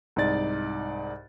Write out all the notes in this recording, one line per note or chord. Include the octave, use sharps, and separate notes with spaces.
C2 G#2 D#4 D5 A6